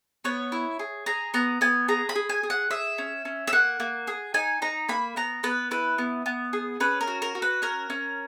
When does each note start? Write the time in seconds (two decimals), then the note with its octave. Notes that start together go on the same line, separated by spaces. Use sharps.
0.24 B3 C#5
0.52 E4
0.79 G#4
1.06 G#4 A#5
1.34 B3 A#5
1.61 B3 G#5
1.88 G#4 A#5
2.09 B5
2.15 G#4
2.29 G#5
2.43 G#4
2.50 F#5
2.71 G#4 E5
2.98 C#4
3.25 C#4
3.47 E5
3.53 A#3 F#5
3.80 A#3
4.07 G#4
4.34 D#4 G#5
4.62 D#4 A#5
4.89 A#3 B5
5.16 B3 A#5
5.43 B3 B4
5.71 E4 B4
5.98 B3
6.26 B3
6.53 G#4
6.80 C#4 B4
7.01 A#4
7.07 F#4
7.22 A#4
7.35 F#4
7.42 B4
7.62 C#4 A#4
7.90 C#4